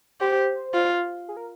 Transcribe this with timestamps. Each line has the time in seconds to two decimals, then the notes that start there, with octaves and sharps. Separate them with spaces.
0.21 G4 C5
0.74 F4
1.28 G#4
1.37 A#4